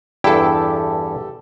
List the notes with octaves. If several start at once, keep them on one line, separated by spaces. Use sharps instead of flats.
E2 G2 E4 G4 A4